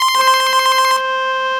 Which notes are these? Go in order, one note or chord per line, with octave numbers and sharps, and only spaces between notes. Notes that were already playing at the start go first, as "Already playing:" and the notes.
Already playing: C6
C5